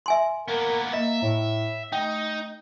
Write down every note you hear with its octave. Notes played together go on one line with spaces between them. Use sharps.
E5 G#5 C6
A#3 B3 A#4
A#3 D#5 E5
A2
A3 D#4 G5